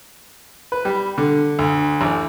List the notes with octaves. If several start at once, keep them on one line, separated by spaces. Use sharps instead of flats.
B4
G3
D3
D2
A1